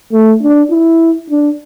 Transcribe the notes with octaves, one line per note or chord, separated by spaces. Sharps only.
A3
D4
E4
D4